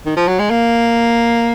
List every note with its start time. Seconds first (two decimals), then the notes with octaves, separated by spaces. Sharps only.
0.06 D#3
0.17 F3
0.28 F#3
0.39 G#3
0.50 A#3